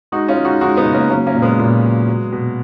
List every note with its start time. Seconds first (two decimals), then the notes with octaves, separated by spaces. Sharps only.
0.12 G#3 D#4 F#4
0.28 C#4 F4
0.37 G#3
0.45 D#4 F#4
0.61 G#3 D#4 F#4
0.77 B3 D#4
0.85 C#3
0.94 A#3 C#4
1.10 F#3 A#3 C#4
1.27 A#3 C#4
1.34 A#2
1.42 G#3 B3
1.59 A#2
1.83 F#3
2.08 F#3
2.32 B2